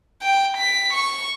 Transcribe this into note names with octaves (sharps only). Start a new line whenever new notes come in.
G5
B6
C#6